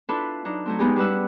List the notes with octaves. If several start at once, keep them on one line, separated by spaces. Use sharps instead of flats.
D4 E4 F4 A4 B4
F#3 D4 D#4
F#3 A3 C4
G#3 B3 D#4 G4 G#4
G3 C#4 D4 B4 F#5 E6